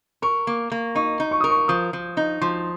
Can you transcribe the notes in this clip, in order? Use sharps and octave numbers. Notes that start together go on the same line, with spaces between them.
A#4 C#6
A#3
A#3
D#4 C#6
D#4
C#6
A#4 D#6
C#6
F3 D#6
F3
D#4
F3 C6